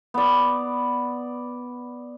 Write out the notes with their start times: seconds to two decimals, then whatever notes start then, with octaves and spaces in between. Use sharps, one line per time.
0.14 B3 D5